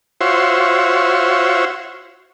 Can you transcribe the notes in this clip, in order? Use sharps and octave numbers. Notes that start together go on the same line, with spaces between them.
F4 F#4 C5 C#5 E5